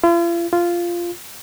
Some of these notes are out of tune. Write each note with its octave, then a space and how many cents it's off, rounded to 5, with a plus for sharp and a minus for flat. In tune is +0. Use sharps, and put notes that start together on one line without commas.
F4 -45
F4 -10